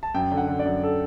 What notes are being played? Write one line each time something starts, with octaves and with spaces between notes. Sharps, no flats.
A5
F#2 G5
D3
F#5
D3
D5
F#2
A4